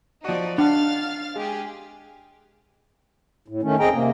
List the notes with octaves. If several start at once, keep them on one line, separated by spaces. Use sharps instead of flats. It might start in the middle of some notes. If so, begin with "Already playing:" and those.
F3 D#4 F#4 D5
D4 F5 F#5 F6 A6
G#3 G4 G#4
A2
D#3 A3 C#4
E2 C4 G#4 D#5 G5 A#5
C3 A#3